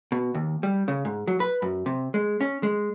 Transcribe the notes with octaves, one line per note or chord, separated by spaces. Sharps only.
B2
D#2
G3
C#3
G#2
F#3
B4
F#2
C3
G#3
C#4
G#3